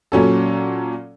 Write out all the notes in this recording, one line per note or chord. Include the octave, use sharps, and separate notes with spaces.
A#2 F#3 C#4 A4